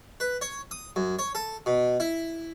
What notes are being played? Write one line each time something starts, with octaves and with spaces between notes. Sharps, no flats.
B4
C#5
D#6
F#2
C#5
A4
B2
E4